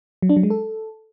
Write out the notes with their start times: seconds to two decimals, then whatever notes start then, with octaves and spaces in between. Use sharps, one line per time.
0.22 F#3
0.29 D4
0.36 F#3
0.43 G#3
0.50 A4